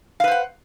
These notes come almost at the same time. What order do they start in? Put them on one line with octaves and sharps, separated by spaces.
F5 B4 C5 F#5